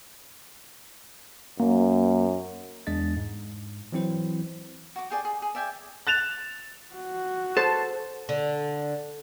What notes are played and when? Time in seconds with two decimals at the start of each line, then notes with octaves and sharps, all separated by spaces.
1.60 F#2 A#3
2.87 E2 G#3 D4 D#5 A6
3.17 G#2
3.92 E3 F#3 C4 E4 C5
4.96 F#4 D6
5.10 G4 G#4 D5
5.25 G#4
5.42 G#4
5.55 D5 E5 G5 G#5
6.07 F#6 A6 E7 F7
6.95 F#4
7.57 A4 C5 A5
8.29 D3